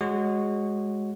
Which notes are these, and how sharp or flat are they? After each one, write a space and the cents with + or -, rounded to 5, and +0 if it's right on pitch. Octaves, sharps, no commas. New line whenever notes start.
G#3 +0 F#4 +0 C#5 -10